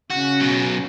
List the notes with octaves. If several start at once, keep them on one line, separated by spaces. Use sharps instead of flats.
C#3 C#4 F#4
B2 F#3